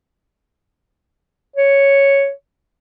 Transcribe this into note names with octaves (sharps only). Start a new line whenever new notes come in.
C#5